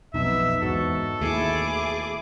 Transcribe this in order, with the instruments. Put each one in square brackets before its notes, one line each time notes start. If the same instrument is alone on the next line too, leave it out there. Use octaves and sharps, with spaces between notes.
[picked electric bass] B1 F2 [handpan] B3 D#4 [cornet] E5
[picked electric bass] E2 G#2 [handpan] F#4 [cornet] A4
[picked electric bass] D#2 [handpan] A3 E4 [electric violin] G#4 D6